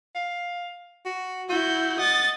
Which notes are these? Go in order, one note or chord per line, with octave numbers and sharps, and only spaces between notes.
F5
F#4
E4 F#4 G6
D#5 F#5 A6